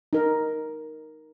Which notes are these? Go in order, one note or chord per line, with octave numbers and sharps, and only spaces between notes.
D#4 A#4